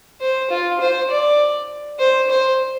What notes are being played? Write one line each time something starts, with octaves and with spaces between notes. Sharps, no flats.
C5
F4
C5
D5
C5
C5